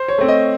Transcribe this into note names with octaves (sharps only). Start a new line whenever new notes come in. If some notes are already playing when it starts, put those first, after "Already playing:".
Already playing: C5
C#5
A3 C4
D#5